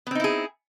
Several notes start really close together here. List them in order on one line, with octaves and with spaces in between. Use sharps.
B3 C4 D#4 E4 G#4